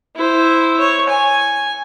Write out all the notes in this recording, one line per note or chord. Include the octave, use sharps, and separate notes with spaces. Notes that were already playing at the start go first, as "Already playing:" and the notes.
E4 C5
C#5
G#5